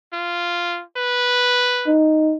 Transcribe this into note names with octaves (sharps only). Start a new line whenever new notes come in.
F4
B4
D#4